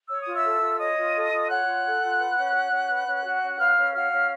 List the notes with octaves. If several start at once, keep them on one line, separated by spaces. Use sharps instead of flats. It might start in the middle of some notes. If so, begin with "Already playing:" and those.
C#5 E6
D#6
F4
E5 E6
A4
F4
C#5 D#5 D#6
F4
A4
F4
C#5 F#5 F#6
F4
A4
F4
B4
C#4
F#4
C#4
B4
C#4
F#4
C#4
B4 F5 F6
C#4
F#4 F5 F6
C#4